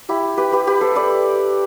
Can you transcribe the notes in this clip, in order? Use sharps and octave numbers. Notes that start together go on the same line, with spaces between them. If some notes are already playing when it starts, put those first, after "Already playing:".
E4 G4
G4 B4
G4 B4
G4 B4
A4 C5
B4 D5